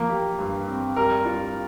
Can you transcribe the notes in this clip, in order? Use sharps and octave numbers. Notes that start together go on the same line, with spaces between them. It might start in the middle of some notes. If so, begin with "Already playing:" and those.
Already playing: F3 A#3
G4
G2
C4
G3 A#4
F4